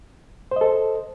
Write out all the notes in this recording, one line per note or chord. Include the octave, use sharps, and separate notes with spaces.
A4 C5 D#5